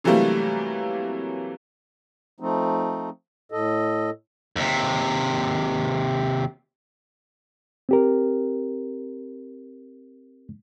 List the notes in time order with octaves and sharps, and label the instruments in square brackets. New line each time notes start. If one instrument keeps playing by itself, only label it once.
[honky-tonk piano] C3 E3 F#3 G3 A3 A#3
[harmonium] F3 A3 C4 D#4
A2 A4 D#5
[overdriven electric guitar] D#2 C3
[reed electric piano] C4 G4 A#4